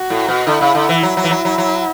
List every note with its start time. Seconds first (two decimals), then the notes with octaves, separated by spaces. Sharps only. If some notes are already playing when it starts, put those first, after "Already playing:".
Already playing: F#4
0.10 A2
0.28 B2
0.47 D3 E4
0.61 C#3
0.75 D3
0.89 E3
1.03 F#3 E4
1.17 F#3
1.24 E3
1.31 F#3
1.45 F#3
1.58 F#3